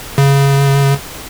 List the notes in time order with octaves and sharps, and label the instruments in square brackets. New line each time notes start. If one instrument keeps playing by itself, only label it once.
[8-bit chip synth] C#3